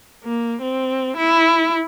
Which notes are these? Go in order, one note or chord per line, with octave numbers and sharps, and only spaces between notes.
A#3
C4
E4